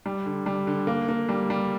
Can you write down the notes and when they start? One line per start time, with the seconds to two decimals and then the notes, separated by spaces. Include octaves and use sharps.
0.06 G3
0.26 D3
0.46 G3
0.67 D3
0.87 A#3
1.09 A#3
1.29 G3
1.50 G3